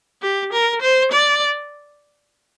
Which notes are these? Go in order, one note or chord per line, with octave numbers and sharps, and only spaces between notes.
G4
A#4
C5
D5